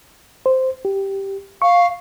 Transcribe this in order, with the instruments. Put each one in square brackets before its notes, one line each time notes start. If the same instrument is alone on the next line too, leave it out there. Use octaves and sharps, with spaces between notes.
[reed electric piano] C5
G4
[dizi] F5 [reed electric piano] C#6